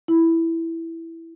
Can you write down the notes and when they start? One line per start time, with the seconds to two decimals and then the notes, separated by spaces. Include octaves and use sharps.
0.08 E4